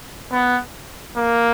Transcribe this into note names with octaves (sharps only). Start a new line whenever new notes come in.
B3
A#3